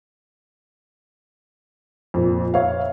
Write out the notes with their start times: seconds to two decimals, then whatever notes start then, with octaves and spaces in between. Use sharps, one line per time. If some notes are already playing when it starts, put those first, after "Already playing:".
2.14 F2 A#2
2.54 C#5 E5 F5